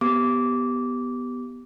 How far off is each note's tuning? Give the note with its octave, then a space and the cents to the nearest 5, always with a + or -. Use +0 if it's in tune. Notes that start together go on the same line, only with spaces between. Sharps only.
B3 +0 G4 +0 D6 -15